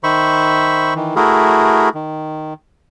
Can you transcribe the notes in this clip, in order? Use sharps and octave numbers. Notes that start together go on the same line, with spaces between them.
D#3 C5 E5 B5 C#6
D#3 E3
A3 E4 F#4 G#4 A#4
D#3